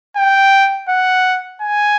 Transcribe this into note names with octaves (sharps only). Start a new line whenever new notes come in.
G5
F#5
G#5